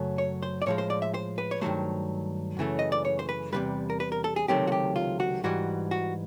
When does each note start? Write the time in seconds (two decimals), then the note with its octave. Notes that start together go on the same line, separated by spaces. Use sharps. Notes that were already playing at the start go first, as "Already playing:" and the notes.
Already playing: F#2 C#3 F#3 A3
0.18 C#5
0.43 C5
0.62 D5
0.66 A2 F3 G#3 C#5
0.78 C5
0.90 D5
1.02 E5
1.14 C5
1.38 B4
1.51 C#5
1.61 G2 D#3 F#3 A3 C5
2.57 F#2 C#3 E3 A3
2.79 D#5
2.92 D5
3.05 C#5
3.19 C5
3.29 B4
3.52 E2 C3 D#3 G3 B4
3.90 A#4
4.00 B4
4.12 A#4
4.24 A4
4.36 G#4
4.48 C#2 C3 D#3 F#3 A3 G4
4.67 F#4
4.72 G4
4.96 F4
5.20 F#4
5.44 G#2 E3 G3 F#4
5.91 F#4